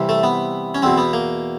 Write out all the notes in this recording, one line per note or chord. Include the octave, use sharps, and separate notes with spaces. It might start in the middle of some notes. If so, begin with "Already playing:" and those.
Already playing: C2 C3 E3
A3
B3
C#4
E2 B2 C4
B3
A#3